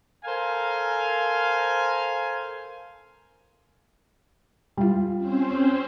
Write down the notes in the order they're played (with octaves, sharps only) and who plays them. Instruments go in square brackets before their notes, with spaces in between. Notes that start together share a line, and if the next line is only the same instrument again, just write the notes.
[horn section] A4 A#4 C5 F5 G#5
[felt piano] G3 F4
[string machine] C4 C#4 C5